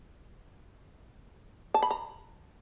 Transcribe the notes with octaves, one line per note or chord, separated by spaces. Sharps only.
A5
B5
A#5